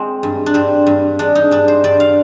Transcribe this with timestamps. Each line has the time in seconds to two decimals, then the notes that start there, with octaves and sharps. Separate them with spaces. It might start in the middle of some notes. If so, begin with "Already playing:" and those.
Already playing: G#3 C4
0.23 G2
0.46 D4
0.54 G2 C4
0.87 G2
1.19 G#3 D4
1.35 D#4
1.51 G2 D4
1.68 C5
1.84 G2 D5
2.00 F5